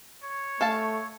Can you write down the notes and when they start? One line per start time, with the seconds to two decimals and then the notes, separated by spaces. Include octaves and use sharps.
0.24 C#5
0.61 A3 A4 F5 A5